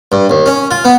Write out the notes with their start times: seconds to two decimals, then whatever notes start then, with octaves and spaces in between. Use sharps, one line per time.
0.12 G2
0.30 D#2
0.46 C#4
0.71 F4
0.85 B3